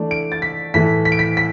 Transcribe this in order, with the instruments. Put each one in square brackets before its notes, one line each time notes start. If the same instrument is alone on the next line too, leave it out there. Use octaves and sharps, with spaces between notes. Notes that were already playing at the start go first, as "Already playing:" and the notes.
Already playing: [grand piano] E3 A3 D4
D7
A6
B6
A2 E3 A3 B6
B6
D7
B6
B6